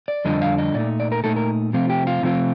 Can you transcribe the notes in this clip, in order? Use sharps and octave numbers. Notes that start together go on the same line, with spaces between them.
D5
F2 D3 G3 D4 F4 D#5
F5
D#5
A#2 A3 D#4 D5
D5
A#4
A#2 A3 D#4 A4
A#4
C3 F3 A3 C4 F4
G4
F4
C3 F3 A3 C4 F4